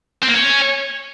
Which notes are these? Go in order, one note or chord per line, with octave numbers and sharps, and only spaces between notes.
C4
A#3
C#4